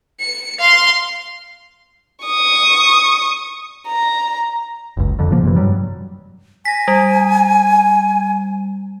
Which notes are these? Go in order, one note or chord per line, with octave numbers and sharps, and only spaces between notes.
C#7
F5 C6
C#6 D#6
A#5
F#1 C#2
F2 D3
A#2 C#3 F3 A#3
F#2 C3 E3
G2 F#3 G3
G#5 A#6 B6
G3